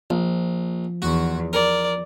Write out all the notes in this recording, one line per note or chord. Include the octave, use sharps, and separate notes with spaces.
A#1 F3
E2 F#4
A#4 D5